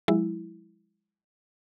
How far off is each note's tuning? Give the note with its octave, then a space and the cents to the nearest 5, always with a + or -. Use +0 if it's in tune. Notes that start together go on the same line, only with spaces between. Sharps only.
F3 +30 G#3 -20 E4 +0